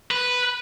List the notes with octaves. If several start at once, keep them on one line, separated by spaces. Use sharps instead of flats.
B4